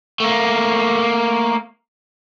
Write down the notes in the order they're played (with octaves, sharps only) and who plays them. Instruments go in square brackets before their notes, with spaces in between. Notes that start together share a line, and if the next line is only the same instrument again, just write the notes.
[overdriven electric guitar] A3 A#3